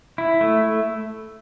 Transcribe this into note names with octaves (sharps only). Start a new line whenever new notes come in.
E4
A3